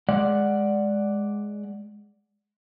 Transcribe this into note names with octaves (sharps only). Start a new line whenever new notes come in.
G#3 D5 F#5